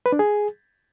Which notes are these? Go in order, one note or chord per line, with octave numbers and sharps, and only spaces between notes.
B4
D4
G#4